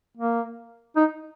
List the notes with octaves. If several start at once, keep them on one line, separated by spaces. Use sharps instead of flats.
A#3
D#4